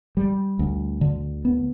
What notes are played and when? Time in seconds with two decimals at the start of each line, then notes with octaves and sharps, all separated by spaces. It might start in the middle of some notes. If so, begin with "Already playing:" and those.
0.17 G3
0.59 D2
1.01 D3
1.45 B3